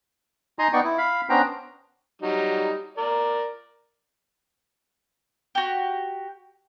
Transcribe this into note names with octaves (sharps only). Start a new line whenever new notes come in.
D#4 D#5 G#5 A#5 C6 D#6
B3 D#4 D5 G5 C#6
E4
F5 B5
B3 C#4 D4 C5 G5 A#5
F#3 G3 D#4
A#4 D5
F#4 G4